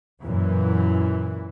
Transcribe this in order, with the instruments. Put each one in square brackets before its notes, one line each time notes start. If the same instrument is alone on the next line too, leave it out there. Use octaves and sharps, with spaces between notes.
[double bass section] F#2 A#2 E3